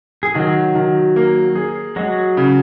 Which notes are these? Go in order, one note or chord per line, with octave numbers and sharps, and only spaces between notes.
G#4
D#3 F#3 F#4
D#3
A#3
G#4
F#3 G#3 F#4
C#3